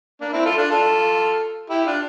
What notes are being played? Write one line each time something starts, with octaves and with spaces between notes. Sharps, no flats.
A#3 D4
C4 E4
F4 A4
D4 F4
F4 A4
E4 G4
D4 F4